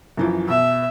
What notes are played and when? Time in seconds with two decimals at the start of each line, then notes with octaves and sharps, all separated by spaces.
0.17 F#2 E3 F3
0.48 B2 E5